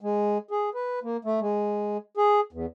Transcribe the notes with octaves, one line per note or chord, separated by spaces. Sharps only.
G#3
G#4
B4
A#3
A3
G#3
G#4
E2